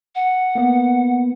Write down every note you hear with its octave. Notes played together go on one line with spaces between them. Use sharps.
F#5
A#3 B3